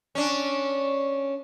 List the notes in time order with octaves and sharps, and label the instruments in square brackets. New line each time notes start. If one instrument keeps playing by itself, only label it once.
[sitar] C#4 D4